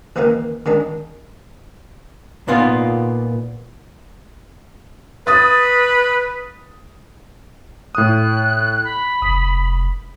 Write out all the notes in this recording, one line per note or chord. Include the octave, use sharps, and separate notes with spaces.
C#2 D#3 E3 A#3 D#4 A#4
D#3 G#3 D4 D#4
A#2 A#3 B3 D#4 F4
B4 D#6 A6
A2 D#6 F#6
B5
F1 D#6